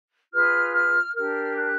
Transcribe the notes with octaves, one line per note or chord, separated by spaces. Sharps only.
F4 G#4 B4 F6
F6
D4 G4 A#4 F6
F#6